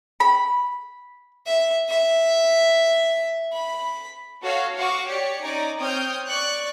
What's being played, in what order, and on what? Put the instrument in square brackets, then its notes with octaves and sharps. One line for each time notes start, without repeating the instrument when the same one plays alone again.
[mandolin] B5
[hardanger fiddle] E5
E5
B5
[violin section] F#4 A4 C#5 F5
F#4 F5 C#6 D6
G4 C#5 D5 C#7
C#4 D#4 D5 G#5 A#5
C4 C#5 G5 D#6 F6 G6
D5 C#6 F#6